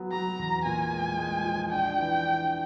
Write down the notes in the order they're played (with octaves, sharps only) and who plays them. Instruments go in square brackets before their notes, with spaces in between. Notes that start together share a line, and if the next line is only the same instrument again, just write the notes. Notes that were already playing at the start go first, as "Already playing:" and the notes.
Already playing: [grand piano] F#3 B3
[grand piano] F#3 [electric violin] A#5
[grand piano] E2
[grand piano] A#2 [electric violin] G#5
[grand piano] G#3
G#3
F3
[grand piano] D4 [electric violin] G5
[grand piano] E3
D4